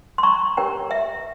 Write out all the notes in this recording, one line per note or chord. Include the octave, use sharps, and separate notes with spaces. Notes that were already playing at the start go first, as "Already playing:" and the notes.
C6
A#5 C#6
C#4 G4 A#4 C#5 G5 A#5
E5